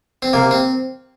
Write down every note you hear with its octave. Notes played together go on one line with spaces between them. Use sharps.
C4
C3 A#3
C4